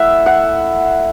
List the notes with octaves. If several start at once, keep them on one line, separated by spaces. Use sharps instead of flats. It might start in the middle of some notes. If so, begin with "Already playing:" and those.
Already playing: A3 E4 E5 F#5
F#5